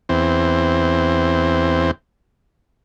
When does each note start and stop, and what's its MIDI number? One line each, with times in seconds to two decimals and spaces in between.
0.09 1.91 40
0.09 1.91 60